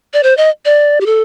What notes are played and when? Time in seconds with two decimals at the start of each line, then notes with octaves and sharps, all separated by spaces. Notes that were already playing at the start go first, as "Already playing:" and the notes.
0.13 D5
0.23 C5
0.37 D#5
0.65 D5
1.01 G4
1.06 A4